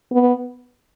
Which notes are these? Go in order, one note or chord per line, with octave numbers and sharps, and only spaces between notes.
B3